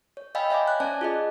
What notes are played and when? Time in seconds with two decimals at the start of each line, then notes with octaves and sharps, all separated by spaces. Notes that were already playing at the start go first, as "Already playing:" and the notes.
0.17 C#5
0.35 D#5 F5 G5 G#5 B5 E6
0.50 C#5 E5 G#5 D6
0.68 F#6
0.80 C#4 C5 D5 G#5 A5
1.01 F4 G#4 D#5